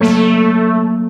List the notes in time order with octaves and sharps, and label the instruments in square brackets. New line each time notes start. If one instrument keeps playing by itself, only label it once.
[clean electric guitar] F#3 A#3 C#5 [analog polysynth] A3